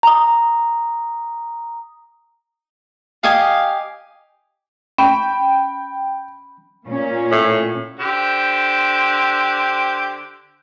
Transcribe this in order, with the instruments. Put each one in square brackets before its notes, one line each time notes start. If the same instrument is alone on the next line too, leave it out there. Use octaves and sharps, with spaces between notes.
[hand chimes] A#5 D#6
[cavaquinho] G4 D#5 G#5 [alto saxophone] F5
[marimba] C#4 [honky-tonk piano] G5 [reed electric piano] B5
[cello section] A#2 C#4
[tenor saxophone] A2
[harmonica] D3 G4 C5